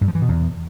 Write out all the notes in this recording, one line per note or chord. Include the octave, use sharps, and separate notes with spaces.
G2
F3
E3
B2
E2